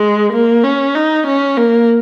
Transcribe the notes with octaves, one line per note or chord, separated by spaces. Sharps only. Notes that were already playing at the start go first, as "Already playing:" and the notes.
Already playing: G#3
A#3
C#4
D#4
C#4
A#3